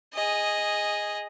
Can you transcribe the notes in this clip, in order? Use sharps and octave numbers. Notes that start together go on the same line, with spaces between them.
G#4 D#5